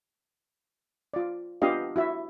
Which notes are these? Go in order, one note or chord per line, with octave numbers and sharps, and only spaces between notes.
F4 D5
B3 D4 F4 G4 D#5 F5
E4 F#4 E5